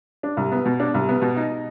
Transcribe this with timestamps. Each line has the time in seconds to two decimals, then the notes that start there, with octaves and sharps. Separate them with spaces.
0.23 D4
0.37 C2
0.52 B3
0.66 B2
0.80 D4
0.94 C2
1.09 B3
1.22 B2
1.36 D#4